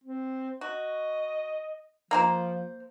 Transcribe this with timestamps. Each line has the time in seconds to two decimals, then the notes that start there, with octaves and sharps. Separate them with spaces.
0.04 C4
0.61 F#4 D#5
2.11 F3 A#3 A#4 C5